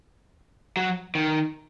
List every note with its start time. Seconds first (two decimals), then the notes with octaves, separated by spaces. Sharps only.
0.77 F#3
1.15 D#3